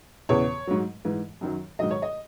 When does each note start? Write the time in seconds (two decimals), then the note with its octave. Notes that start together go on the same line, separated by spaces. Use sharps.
0.29 E2 C#3 E3 C#5
0.67 G#2 F#3
1.05 G#2 E3
1.41 F#2 D#3 F#3
1.79 G#2 D#3 F#3 D#5
1.91 C#5
2.02 D#5